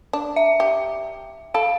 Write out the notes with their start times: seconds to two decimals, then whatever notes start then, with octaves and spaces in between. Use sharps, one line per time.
0.13 D4
0.36 E5
0.60 G4
1.54 A4 F5